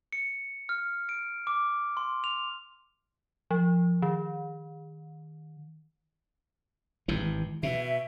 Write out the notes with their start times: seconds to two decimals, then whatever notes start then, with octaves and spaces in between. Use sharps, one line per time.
0.12 C#7
0.69 F6
1.09 D7
1.47 D6
1.97 C6
2.24 F7
3.51 F3
4.02 D#3
7.08 G#1 G2 E3
7.63 B2 E5